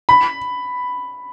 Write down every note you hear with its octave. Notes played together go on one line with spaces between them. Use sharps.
B5